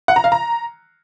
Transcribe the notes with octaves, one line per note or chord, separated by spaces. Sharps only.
F#5
A#5
F5
A#5